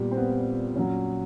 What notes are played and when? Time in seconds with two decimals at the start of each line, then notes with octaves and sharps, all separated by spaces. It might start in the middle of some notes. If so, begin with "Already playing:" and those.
Already playing: A#2 G3 B3
0.11 C4
0.17 B3
0.76 A#2 F#3 C#4